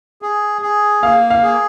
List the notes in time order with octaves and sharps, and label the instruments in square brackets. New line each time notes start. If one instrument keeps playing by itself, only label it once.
[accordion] G#4
G#4
[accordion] A#3 [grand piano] F5
[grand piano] F5
[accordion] G#4